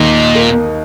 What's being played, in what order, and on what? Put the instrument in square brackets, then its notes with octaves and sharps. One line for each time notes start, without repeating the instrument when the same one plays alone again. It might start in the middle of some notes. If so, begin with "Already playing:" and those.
Already playing: [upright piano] D#2 D#4 [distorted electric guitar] A#2
[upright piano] A#3